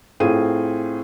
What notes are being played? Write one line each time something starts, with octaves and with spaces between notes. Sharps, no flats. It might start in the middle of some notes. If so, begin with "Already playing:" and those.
A2 C4 F4 G#4 D#7